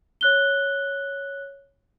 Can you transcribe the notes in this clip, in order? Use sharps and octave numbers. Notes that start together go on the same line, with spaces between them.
C#5 F#6 G7